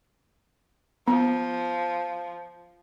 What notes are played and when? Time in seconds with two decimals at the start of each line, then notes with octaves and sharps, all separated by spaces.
1.08 F3 B3